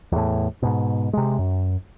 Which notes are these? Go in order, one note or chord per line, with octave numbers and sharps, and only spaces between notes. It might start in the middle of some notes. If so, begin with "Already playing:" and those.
E2 A2
G#2 B2
C3 G#3
F#2